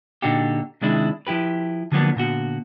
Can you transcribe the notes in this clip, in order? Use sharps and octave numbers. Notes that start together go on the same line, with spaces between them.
A#2 D3 D4 D#4 F#4 G4
C3 D#3 G#3 D4 E4
F3 E4 G4 B4
D3 F3 F#3 A#3 B3 D4
A#2 D3 B3 F#4